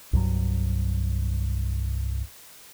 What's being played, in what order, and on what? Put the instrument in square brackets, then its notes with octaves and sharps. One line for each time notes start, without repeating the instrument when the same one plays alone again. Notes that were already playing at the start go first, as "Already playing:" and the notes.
[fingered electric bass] C2 G2 F#3